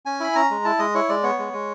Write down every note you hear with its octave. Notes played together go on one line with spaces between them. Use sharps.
C#4 G#5
E4 B5
C#4 A#5
G#3
E4 A5
G#3 D#5
E4 C#5
G#3 D5
B3 C#5
G#3
G#3